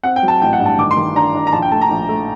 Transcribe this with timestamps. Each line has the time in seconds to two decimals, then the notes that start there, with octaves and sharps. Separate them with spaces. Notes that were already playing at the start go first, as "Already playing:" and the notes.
0.03 C4 F#5
0.16 G5
0.23 F#3
0.28 A5
0.42 A1 G5
0.53 F#5
0.60 G2
0.66 A5
0.79 D#3 D6
0.91 C6
0.97 D#3
1.16 D4 A#5
1.35 D4
1.47 A#5
1.53 A#1 A5
1.62 G5
1.72 A3 A5
1.81 A#5
1.91 A#1
2.09 A3